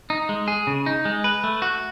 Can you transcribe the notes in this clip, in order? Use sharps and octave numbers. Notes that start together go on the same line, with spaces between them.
D#4
G#3
G#4
C#3
D#4
G#3
B4
A3
F#4